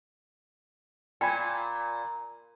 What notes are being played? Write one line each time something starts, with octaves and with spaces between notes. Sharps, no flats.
A#2 G5 G#5 B5 G#6